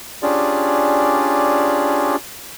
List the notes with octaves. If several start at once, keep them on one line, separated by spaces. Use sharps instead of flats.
C#4 D4 F4 G4 G#4 D5